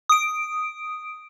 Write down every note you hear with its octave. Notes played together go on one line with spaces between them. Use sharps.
D#6 D7